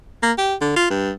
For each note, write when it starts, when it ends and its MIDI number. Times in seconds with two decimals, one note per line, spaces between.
0.23 0.33 58
0.38 0.55 67
0.61 0.73 50
0.76 0.88 65
0.90 1.11 43